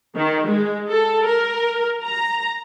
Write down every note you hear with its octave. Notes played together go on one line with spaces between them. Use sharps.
D#3
G#3
A4
A#4
A#5